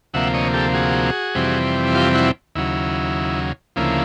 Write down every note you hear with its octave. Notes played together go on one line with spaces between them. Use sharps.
D2 C3 F3 A#3 E5 F#5
C#5 D#5
G4 A4
F#4 G#4
F2 C3 E3 G3 C4
F4 G4
E4 F#4
D#2 C#3 F#3 E4
D2 C#3 F3 A#3 E4